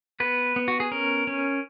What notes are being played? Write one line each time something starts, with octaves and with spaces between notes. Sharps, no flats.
B3 B4
B3
F#4
G#4
C#4 A#4
C#4